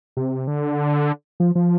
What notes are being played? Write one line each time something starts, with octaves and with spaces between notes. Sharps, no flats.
C3
D3
F3
F3